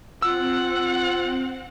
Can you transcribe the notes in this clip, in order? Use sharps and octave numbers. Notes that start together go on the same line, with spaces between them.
C4 F4 F#5 E6